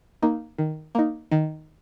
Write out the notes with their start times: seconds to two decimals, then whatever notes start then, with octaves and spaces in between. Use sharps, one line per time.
0.23 A#3 D#4
0.58 D#3
0.95 A#3 D#4
1.32 D#3